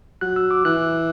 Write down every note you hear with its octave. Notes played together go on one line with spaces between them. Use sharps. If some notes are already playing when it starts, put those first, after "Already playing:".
F#3 F#6
E6
D6
E3 F#6